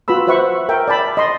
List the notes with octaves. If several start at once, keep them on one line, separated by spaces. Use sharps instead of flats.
F4 F#4 B4 B5 E6
B4 C5 E5 F#5 C#6
A#4 E5 G5
D5 G5 A5 B5
D#5 C6